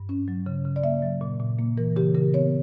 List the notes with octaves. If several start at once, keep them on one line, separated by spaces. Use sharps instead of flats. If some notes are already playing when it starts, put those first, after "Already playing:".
Already playing: G2
C#4
F#3
C#3
C#3
D5
A#3 E5
F#3
A#2
A#2
A#3
E3 A#4
C#3 G4
C#3 A#4
B3 C#5